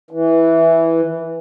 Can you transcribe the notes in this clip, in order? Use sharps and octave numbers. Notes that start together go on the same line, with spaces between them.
E3